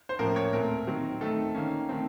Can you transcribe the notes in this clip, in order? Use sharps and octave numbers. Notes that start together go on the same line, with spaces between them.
C5
A2 F3 A#3 C#4 A#4
A#4 C#5
A#2 A3 C4 A#4
D#3 F#3 C4
D#3 A3 C4 A4
D#3 A#3 C#4
D#3 A3 C4